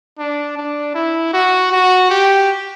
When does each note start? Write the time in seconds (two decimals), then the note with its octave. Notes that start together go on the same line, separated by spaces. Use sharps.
0.19 D4
0.57 D4
0.95 E4
1.33 F#4
1.72 F#4
2.10 G4